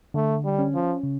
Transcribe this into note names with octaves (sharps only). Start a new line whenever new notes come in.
D3 A3
G3
C#4
F3
C#3